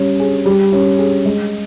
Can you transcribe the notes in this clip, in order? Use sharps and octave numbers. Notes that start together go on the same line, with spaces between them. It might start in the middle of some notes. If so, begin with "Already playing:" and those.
Already playing: G3 C#4
G#4
G3
C#4
G#4
G#3